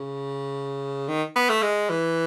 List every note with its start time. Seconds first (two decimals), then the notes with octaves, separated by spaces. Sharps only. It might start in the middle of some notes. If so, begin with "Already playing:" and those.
Already playing: C#3
1.08 D#3
1.36 B3
1.49 A3
1.63 G#3
1.90 E3